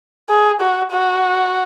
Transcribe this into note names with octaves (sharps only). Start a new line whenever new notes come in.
G#4
F#4
F#4